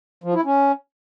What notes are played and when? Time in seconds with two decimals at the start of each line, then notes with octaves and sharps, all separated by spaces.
0.24 F3
0.34 E4
0.45 C#4